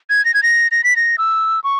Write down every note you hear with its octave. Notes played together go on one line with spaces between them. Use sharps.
G#6
A#6
G#6
A#6
A#6
B6
A#6
E6
C#6